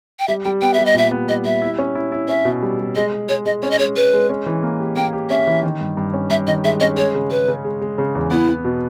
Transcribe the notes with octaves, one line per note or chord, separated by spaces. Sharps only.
G5
G3 E5
G3 G5
B3 G5
G3 E5
D#5
A#2 E5
B3
G3 D#5
G3 E5
E4
C#4
E4
E4
C#4 E5
B2
G3
G3
G#3 D#5
G#3
G#3 C#5
G#3 D#5
C#4 C#5
D#5
G#3 C#5
G#3 B4
G#3
C#4
E3
A#3
G4
A#3 G5
G4
C#4 E5
E3
D#3
G2
G2
C#4
G2 E5
D#3 D#5
G#3 E5
C#4 D#5
G#3 C#5
C#3
G#3 B4
C#3
G#3
G#3
C#3
E2
B3 E4
B3
B2